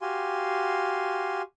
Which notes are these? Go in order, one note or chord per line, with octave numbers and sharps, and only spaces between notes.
F#4 G4 F5 G#5 C6